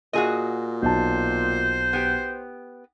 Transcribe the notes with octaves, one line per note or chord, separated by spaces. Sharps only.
A#2 F#4 G#4 D#5
B1 C5 A5
B3 G4